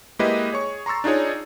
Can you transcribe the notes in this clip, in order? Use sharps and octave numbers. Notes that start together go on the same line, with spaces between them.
G#3 A#3 E4 G4 B4 D#5
G#4 C#5 C#6
A#5 C6 C#6 E6 A6
D4 D#4 F4 G#4 C#5